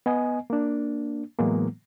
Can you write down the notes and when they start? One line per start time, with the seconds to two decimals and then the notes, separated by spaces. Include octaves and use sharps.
0.06 B3 D#5 G#5
0.50 A#3 D4
1.39 A2 E3 F#3 G#3 A#3 B3